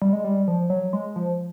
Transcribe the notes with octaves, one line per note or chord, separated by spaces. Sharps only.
G3
G#3
G3
F3
F#3
G#3
F3